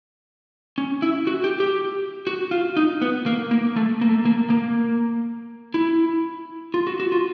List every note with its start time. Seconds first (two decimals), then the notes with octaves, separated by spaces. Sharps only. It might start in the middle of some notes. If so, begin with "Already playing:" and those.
0.78 C#4
1.02 E4
1.27 F#4
1.44 G4
1.60 G4
2.27 F#4
2.51 F4
2.77 D#4
3.02 B3
3.26 A#3
3.51 A#3
3.76 A3
4.01 A#3
4.09 A3
4.25 A#3
4.50 A#3
5.74 E4
6.74 F4
6.87 F#4
7.00 F#4
7.12 F4